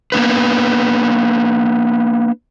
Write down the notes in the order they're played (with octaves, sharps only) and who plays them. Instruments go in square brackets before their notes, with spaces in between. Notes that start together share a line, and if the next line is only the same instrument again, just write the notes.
[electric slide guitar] A#3 B3 D4 B4